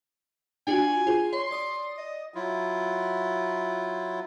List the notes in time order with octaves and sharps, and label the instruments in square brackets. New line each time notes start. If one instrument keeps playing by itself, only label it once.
[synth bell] D4 F4 F#4 [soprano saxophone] G#5
[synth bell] F4 G#4 C5
[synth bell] C#5 [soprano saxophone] C6
[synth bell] D5 D#6
[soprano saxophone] D#5
[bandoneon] F#3 E4 F4